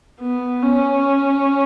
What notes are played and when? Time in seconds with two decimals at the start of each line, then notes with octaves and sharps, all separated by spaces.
0.20 B3
0.62 C#4